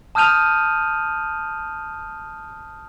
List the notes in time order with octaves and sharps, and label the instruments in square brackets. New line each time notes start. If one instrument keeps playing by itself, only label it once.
[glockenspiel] A5 D#6 F6 G6 D#7 F7